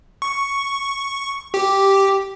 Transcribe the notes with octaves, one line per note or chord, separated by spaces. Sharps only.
C#6
G4